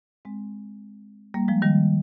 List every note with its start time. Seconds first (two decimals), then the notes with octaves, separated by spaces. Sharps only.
0.25 G#3 C4
1.34 G3 A#3
1.48 F3 G#3
1.62 D#3 G3